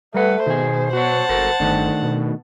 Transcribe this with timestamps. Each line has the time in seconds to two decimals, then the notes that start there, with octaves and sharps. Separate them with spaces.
0.14 G3 A3 B4 F#5
0.46 B2 D#3 G#4 C5
0.93 F#4 C#5 F#5 A5
1.29 G1 F#4 A4 A#4
1.60 G1 D#3 A3 D4
2.02 B2